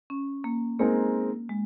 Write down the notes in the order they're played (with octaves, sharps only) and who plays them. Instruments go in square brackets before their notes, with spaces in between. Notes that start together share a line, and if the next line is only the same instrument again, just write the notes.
[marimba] C#4
A#3
[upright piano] G#3 C4 D#4 A#4 [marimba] A#3
[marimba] G#3